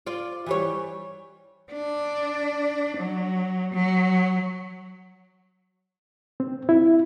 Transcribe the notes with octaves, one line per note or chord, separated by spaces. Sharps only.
F4 D5
E3 G3 C#5
D4
F#3
F#3
C4
E4